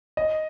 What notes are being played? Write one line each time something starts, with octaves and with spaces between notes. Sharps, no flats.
D#5